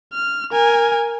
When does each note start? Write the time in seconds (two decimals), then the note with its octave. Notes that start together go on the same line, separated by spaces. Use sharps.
0.13 F6
0.52 A#4 G#5